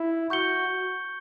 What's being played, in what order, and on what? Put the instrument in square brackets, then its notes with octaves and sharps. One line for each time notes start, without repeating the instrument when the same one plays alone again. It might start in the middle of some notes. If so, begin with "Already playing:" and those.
Already playing: [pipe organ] E4
[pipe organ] F#4 [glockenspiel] C#6 G6 C#7 G7